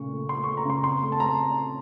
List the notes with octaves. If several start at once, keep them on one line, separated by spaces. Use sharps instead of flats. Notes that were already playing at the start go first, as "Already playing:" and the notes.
Already playing: A#2 C#3 A3 C#6
A3
A3 C6
C#6
A3
A#5
C#3 C6
C4 C6
A3
A5
C4 A#5